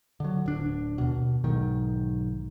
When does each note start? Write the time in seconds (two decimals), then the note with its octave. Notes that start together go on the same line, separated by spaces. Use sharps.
0.20 D3 F#3
0.46 D1 D4
0.98 D#2 B2
1.44 B1 G#2 D#3